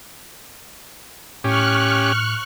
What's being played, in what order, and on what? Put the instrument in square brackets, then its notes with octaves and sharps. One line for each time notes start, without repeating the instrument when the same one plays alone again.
[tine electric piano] A2 [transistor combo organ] C#4 G4 [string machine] C#6 F6 F#6